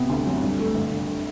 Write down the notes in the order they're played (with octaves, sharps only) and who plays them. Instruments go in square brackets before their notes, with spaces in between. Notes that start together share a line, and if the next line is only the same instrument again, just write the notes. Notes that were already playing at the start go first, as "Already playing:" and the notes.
Already playing: [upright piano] C3 B3
D2
F#3
G2
A3
G1
D3